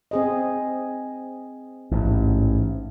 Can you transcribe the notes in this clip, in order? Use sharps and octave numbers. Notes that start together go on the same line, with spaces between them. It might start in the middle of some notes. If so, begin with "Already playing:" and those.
C4 G#4 D#5
A1 G#2